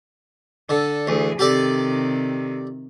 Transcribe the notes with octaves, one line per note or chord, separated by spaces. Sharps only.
D3 A4
D2 E3 G#4
C3 D#3 G4 A4 D5